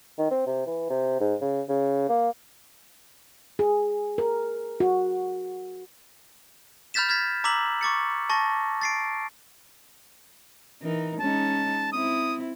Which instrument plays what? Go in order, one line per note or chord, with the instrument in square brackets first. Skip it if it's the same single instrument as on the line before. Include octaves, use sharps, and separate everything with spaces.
[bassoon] D#3
C4
C3
E3
C3
G#2
C#3
C#3
A#3
[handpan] G#4
A#4
F#4
[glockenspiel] B5 F6 G6 A6 B6 E7
F6 G#6 A6 B6
A#5 D6 E6 B6 F#7
C#6 D6 A6 C#7
A5 C#6 A6 A#6
A6 C7 D7
[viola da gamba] E3 D#4 A#4
[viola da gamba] G#3 C#4 D#4 [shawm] A5
[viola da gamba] C4 E4 [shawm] D#6